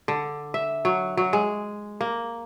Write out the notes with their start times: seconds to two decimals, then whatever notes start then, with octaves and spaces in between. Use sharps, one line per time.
0.08 D3
0.54 E5
0.85 F#3
1.17 F#3
1.33 G#3
2.01 A#3